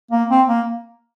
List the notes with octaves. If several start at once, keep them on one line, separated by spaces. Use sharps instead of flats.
A#3
C4
A#3